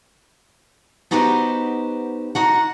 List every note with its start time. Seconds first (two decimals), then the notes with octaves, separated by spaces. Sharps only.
1.11 B3 D#4 F#4 G4 B4 C5
2.35 D#4 F#4 F#5